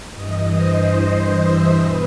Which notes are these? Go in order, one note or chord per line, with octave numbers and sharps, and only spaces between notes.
G2 E3 D#5
C5
D#5
E5
E2 B2 B4